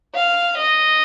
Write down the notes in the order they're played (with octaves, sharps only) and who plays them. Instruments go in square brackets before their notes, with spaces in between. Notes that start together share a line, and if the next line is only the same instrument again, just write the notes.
[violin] F5
D#5